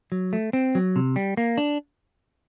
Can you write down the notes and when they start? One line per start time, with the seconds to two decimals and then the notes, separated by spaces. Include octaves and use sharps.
0.12 F#3
0.33 A3
0.53 C4
0.75 F#3
0.96 C3
1.16 G3
1.37 A#3
1.58 D4